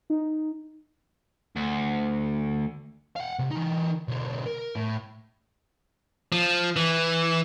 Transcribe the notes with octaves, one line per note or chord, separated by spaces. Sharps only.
D#4
D2
F5 F#5
C3
E3 D#4
B1 D3
A#4
A2
F3
E3